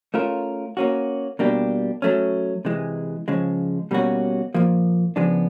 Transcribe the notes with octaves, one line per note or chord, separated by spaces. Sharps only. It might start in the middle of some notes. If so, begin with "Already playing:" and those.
A3 C#4 F4 A#4
A#3 C#4 F#4
B2 G3 A#3 D4 G4
F#3 A3 C#4
C3 E3 G#3
C#3 F3 G#3
B2 G3 A#3 C#4 F#4
A#2 F3 A#3
C#3 F3 G#3 B3 D4